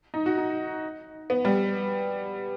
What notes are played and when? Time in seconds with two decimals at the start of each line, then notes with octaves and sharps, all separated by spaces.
0.14 D#4
0.26 F#4
0.38 D#4
1.30 B3
1.45 G3